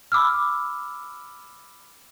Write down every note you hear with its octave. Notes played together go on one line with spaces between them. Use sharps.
B5 D6 E6 F6